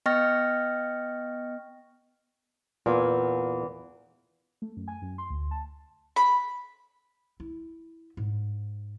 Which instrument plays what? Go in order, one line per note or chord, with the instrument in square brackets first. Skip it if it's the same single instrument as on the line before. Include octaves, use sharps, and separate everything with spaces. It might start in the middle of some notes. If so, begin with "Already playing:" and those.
[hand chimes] B3 D#5 G5 C#6 F6 A#6
[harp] E2 [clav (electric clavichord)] A#2
[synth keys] A3
F#2
G#5
F#2
C6
D2
A5
[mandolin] B5
[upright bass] E4
G#2